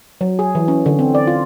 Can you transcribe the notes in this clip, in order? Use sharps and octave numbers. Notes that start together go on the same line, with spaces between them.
F#3
G#4
E3
C#4
D3
C4
D5
F4